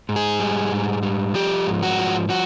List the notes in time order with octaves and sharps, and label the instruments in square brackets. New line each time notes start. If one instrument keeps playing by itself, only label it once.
[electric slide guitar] G#2
G#4
G3
G#2
G3
F3 G4
G#2
F#4
F3
F3 F#4